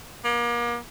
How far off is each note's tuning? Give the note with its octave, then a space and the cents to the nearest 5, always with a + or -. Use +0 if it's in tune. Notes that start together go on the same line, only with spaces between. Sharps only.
A#3 +35